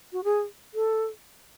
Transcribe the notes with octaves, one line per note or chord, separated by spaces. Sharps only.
F#4
G#4
A4